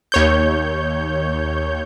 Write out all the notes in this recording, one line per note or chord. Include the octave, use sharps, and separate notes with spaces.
D#2 C#5 G6